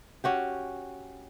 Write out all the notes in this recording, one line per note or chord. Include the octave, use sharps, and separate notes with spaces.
C#4 F#4 G4